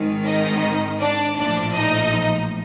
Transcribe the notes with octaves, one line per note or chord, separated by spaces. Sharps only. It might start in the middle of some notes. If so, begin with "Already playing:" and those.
Already playing: G#1 G#2 D#3
D#4 D#5
D4 D5
A#1 A2 F3 D4 D5
D#4 D#5